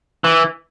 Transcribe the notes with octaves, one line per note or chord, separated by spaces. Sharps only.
E3